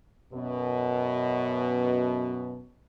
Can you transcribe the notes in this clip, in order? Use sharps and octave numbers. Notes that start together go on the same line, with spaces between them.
F#2 B2